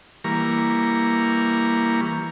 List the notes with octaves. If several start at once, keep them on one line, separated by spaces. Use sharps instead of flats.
E3 G3 A#3 A#5 C#6